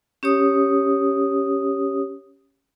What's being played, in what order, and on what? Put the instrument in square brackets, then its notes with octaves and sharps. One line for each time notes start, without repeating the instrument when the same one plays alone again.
[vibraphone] C#4 G4 C#5 D#6